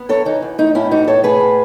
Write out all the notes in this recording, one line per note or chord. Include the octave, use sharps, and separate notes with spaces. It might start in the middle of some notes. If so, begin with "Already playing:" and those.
Already playing: B3
F#2 A4 C#5
E3 D#4
F#2
A3 D#4
A2 C#4 E4
E3 D#4 F#4
A2 A4 C#5
A3 G#4 B4
A2